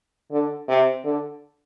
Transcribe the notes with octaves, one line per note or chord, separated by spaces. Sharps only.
D3
C3
D3